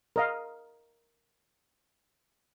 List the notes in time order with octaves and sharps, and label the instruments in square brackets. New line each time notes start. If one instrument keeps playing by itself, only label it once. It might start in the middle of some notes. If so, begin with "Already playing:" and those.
[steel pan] A#4 D#5 F5